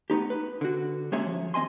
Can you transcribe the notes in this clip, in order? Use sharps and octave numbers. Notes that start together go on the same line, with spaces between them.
A3 B3 D#4 G4
B4
D3 F#4
G#3 A#3 C#4 G#4 C#5 E5
F3
D#2 C4 D#5 G#5 C6